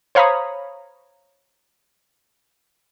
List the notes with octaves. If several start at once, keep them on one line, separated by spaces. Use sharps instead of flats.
C5 C#5 F5 A#5 B5 D#6